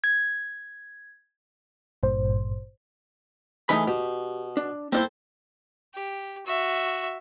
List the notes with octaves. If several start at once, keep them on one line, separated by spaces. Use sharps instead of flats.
G#6
G#1 G2 A#2 C5
E3 A3 D#4 G#4 B5
B2 G4
D4
A#3 C4 D4 E4 A4 C5
G4
F#4 E5